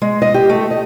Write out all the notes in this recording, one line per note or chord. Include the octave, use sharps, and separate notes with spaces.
G#3
D#5
G4
A3
D#5